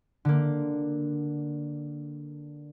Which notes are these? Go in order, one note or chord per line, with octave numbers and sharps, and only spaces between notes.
D3 A#3